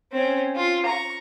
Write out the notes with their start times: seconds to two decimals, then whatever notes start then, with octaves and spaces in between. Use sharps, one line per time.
0.12 C4 C#4
0.56 F4
0.86 A#5 C#6